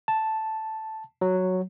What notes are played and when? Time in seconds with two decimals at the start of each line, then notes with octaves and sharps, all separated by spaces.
0.08 A5
1.21 F#3